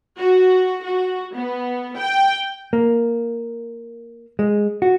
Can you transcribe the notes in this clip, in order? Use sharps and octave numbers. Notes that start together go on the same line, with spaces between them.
F#4
F#4
B3
G5
A#3
G#3
F#4